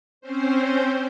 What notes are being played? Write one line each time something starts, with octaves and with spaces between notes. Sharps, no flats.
C4 C#4 C5